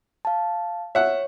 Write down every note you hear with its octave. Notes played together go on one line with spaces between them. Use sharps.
F5 A5
C#5 E5 F#5